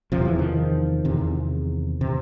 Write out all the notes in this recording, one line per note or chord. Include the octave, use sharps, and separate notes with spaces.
E2 C3 F3
E3
D#3 F3
E2 C3
C3